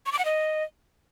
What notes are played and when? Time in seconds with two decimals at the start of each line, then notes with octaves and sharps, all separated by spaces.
0.06 C#6
0.12 D6
0.19 F#5
0.25 D#5